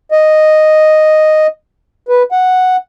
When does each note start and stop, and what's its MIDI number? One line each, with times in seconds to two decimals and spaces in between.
0.11 1.47 75
2.09 2.23 71
2.32 2.77 78